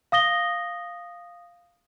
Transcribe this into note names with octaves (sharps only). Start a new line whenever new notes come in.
F5 D#6 A#6 G7